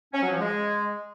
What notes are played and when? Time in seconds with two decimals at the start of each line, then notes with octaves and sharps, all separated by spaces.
0.13 C#4
0.22 F#3
0.31 F3
0.40 G#3